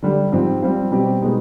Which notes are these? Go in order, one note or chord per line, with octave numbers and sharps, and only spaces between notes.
D3 G3 D4
G#2 F3 C4 G4
G3 C4 F4
B2 G3 C4 G4
B2 G#3 B3 D#4